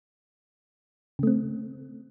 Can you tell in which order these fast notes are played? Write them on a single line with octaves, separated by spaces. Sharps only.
C#3 A3 C4